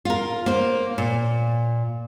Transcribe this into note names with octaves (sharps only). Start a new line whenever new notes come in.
F4 A#4
A#3 C5
A#2